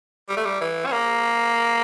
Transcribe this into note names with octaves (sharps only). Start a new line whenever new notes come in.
G3
A3
G3
E3
C#4
A#3